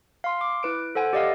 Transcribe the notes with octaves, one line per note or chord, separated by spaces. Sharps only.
F5 C6
D6
E4 B4 D7
A4 C5 F#5 G#5
G4 D5 D#5 F5